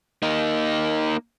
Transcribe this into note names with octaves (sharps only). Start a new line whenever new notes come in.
A#3 D#4